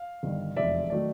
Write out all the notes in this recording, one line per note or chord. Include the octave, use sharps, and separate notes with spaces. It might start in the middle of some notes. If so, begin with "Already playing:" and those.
Already playing: F5
G1 G2 D#3
F1 E2 B2 G#3 D5 E5
D#3 F#3 A3 D5